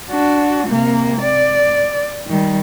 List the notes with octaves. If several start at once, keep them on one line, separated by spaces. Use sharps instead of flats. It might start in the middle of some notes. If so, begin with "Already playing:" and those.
D4 F#4
C3 A#3
D5
D#3 G3